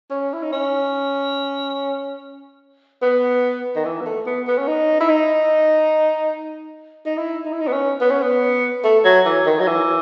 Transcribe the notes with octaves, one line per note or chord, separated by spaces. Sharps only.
C#4
E4
D#4
C#4
B3
D#3
E3
B3
A3
B3
B3
C#4
D#4
E4
D#4
D#4
E4
D#4
E4
D#4
B3
C#4
B3
C#4
B3
A3
F#3
E3
D#3
F#3
E3